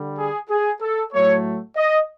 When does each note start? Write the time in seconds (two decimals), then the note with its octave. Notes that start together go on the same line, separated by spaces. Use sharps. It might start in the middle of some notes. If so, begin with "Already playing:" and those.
Already playing: D3 G3
0.18 G#4
0.49 G#4
0.81 A4
1.13 A2 F#3 A3 C#5
1.76 D#5